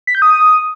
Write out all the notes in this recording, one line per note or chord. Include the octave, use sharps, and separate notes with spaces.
B6
G6
D#6